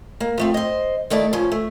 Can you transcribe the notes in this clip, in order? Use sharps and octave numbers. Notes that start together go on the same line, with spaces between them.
A#3
F3 A3 C4
C5 D#5
D#3 A3 E4 D5
C#3 F3 C#4
A3